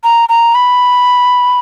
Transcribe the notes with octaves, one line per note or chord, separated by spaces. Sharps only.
A#5
A#5
B5